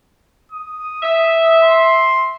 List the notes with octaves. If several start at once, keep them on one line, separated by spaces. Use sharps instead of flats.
D#6
E5
C6